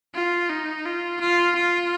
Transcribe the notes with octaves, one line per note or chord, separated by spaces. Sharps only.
F4
D#4
F4
F4
F4